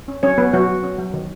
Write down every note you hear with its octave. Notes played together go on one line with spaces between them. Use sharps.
C#4
F#3 C#4 C#5
F#3 B3 B4
F#3 F#4
F#3
C#4
F#3
D#3